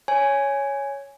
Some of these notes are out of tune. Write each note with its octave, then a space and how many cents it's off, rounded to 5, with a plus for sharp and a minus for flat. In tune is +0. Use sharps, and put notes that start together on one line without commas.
C#5 +5 G#5 +0